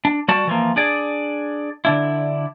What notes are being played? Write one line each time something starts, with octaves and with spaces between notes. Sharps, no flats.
D4
G3 F#4 D5 A5
E3 F3 A#3
D4 G#4 D5
D3 D4 E4